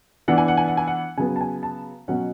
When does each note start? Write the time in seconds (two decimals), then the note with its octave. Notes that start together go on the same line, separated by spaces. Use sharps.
0.28 E3 B3 D4 F#5
0.38 G#5
0.48 F#5
0.57 G#5
0.68 F#5
0.77 G#5
0.87 F#5
1.17 C#3 F#3 B3 G#5
1.36 A5
1.41 G#5
1.63 A5
2.08 B2 F#3 C#4 F#5